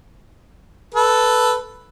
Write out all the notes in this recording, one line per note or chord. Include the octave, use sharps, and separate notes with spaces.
A4 B4